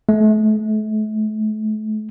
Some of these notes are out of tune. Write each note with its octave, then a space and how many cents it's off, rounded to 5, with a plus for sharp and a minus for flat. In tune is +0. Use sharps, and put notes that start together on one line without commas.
A3 -35